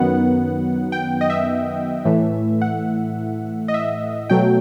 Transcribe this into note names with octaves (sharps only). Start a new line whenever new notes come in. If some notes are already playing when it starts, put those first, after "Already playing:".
Already playing: F#2 D#3 F#3 B3 F#5
G5
D#5
E5
A2 E3 A3
F#5
D#5
E5
B2 F#3 A3 G5